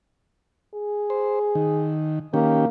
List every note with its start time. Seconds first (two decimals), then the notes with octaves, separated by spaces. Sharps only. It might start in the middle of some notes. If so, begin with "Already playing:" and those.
0.74 G#4
1.10 C5
1.55 D#3
2.34 D#3 A#3 C#4 G4